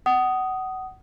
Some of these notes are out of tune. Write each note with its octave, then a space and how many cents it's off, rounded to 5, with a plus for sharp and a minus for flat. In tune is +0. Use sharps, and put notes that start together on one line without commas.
F#5 +25 D#6 +0